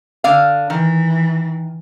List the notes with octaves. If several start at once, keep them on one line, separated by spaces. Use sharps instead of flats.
D3 D5 F5
D#3 E3